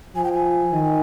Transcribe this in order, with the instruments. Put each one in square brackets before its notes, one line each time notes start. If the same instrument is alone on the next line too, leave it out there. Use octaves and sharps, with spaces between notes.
[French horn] F3 [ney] G#5
[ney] G5
G#5
[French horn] D#3